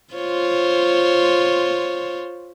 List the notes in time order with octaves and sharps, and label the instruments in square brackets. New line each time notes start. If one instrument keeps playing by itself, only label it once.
[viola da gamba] F4 C5 C#5